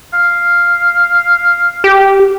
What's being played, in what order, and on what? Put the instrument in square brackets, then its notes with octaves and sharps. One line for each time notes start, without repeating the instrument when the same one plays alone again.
[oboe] F5
[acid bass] G4